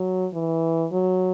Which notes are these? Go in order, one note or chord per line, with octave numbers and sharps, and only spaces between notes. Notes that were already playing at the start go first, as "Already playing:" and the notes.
Already playing: F#3
E3
F#3